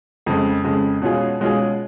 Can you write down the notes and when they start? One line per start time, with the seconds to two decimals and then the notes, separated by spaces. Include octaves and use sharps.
0.26 F2 C#3 G#3
0.64 F2 C#3 G#3
1.02 B2 G#3 C#4 F4 G#4
1.40 B2 G#3 C#4 F4 G#4